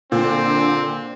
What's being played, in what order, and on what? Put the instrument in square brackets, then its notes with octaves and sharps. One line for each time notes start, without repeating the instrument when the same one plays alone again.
[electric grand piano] A#2 [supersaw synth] D3 [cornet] C4